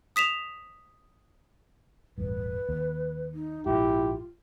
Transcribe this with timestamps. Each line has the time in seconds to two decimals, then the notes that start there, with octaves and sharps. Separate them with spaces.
0.16 D#6 B6 E7 F7
2.18 E1 A1 G2 B4
2.69 D#2
3.34 D#4
3.66 A#1 G#2 E4 F4 G4